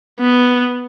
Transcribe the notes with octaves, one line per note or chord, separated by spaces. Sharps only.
B3